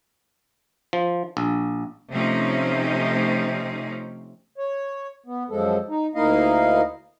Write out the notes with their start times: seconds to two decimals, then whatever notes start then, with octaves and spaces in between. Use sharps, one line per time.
0.93 F3
1.37 A#1
2.11 C3 F3 A3 C4 C#4 D#4
4.58 C#5
5.26 B3
5.50 F#2 F3 G#3 A4
5.89 D#4
6.15 D2 A#3 D#4 E4 D#5 F5